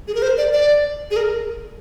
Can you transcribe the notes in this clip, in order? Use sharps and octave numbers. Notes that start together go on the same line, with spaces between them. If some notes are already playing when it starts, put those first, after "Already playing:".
G#4
A#4
C5
D5
D5
G#4
A#4